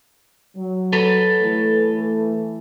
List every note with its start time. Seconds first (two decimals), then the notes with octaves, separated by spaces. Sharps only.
0.57 F#3
0.93 A4 B4 C#5
1.42 E3 A3